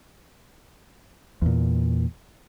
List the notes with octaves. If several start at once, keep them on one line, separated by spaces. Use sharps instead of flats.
E2 A#2